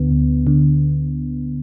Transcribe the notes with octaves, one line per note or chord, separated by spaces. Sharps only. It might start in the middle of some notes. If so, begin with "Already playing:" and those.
Already playing: D2 D3 B3
D2
D3